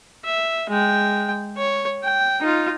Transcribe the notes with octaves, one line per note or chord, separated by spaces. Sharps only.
E5
G#3 G5
C#5
G5
D#4 F4